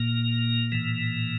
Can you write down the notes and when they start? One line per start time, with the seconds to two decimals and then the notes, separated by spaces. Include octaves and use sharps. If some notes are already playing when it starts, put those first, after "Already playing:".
Already playing: A#2 A#3
0.72 A2 E3